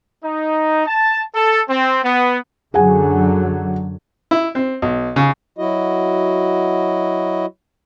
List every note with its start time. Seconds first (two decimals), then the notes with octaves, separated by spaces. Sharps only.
0.24 D#4
0.87 A5
1.35 A4
1.70 C4
2.04 B3
2.74 F#2 D3 F#3 G#4 F#5 G#5
4.31 E4
4.55 C4
4.82 B1
5.16 C#3
5.58 F#3 E4 F#4 D#5